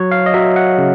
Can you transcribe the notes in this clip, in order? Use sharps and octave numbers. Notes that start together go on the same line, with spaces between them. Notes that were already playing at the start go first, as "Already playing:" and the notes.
Already playing: F#3 C#5
F5
D#5
F#3 E5
F#5
C#3